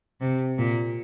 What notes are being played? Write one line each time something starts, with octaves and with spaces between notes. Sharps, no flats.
C3
A#2